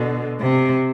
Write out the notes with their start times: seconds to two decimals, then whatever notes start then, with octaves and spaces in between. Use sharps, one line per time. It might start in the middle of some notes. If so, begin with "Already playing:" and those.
Already playing: B2 D3
0.40 C3